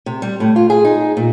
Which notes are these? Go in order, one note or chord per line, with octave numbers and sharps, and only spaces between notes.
C3
G3
A2
F4
G#4
D#4
A#2